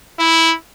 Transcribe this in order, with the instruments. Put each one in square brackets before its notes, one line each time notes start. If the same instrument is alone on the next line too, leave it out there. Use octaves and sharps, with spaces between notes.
[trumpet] E4